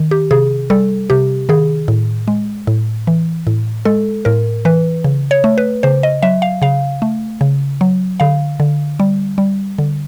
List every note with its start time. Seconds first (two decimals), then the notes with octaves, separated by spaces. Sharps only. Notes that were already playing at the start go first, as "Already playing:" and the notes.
Already playing: D#3
0.11 G4
0.31 C3 G#4
0.70 G3 A4
1.10 C3 G4
1.49 D#3 G#4
1.88 A2
2.28 G#3
2.67 A2
3.07 E3
3.47 A2
3.85 G#3 A4
4.25 A2 A#4
4.65 E3 B4
5.04 C#3
5.31 C#5
5.44 A3
5.58 B4
5.83 C#3 C5
6.03 D#5
6.22 F#3 E5
6.42 F5
6.62 C#3 F5
7.02 A3
7.41 C#3
7.81 F#3
8.20 D3 F5
8.60 D3
9.00 G3
9.38 G3
9.78 D3